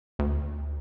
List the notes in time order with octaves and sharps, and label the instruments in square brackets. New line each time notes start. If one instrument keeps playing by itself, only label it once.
[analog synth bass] D2